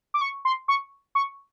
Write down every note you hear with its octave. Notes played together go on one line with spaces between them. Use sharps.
D6
C#6
C6
C#6
C#6